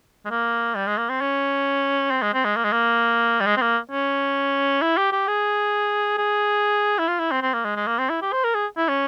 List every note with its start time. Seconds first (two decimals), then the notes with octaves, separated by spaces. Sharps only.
0.25 G#3
0.30 A#3
0.76 G3
0.87 G#3
0.98 A#3
1.09 C4
1.21 C#4
2.11 C4
2.22 G#3
2.34 C4
2.45 G#3
2.57 A#3
2.64 G#3
2.73 A#3
3.41 G3
3.46 G#3
3.57 C4
3.62 A#3
3.92 C#4
4.82 E4
4.97 G4
5.12 G4
5.28 G#4
6.18 G#4
6.99 E4
7.08 F4
7.20 E4
7.31 C4
7.42 C4
7.54 A#3
7.65 G#3
7.76 G#3
7.87 A#3
7.99 C4
8.10 E4
8.22 G4
8.33 C5
8.44 A#4
8.55 G#4
8.77 E4
8.88 C#4